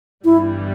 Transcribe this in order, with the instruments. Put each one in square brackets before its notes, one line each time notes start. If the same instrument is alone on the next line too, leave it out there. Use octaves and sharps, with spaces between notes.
[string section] G1 G2 E3 G3 [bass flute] E4